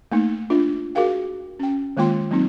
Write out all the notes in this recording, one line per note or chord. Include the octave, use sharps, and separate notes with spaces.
A3 A#3 D#4
D4 F4
F#4 G#4 A#4 F5 G5
C#4 G5
D#3 G#3 A#3 F4 G5 C6
F#3 A#3 C4 D#4